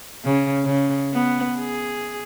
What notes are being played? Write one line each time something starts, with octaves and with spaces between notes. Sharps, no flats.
C#3
C#3
B3
G#4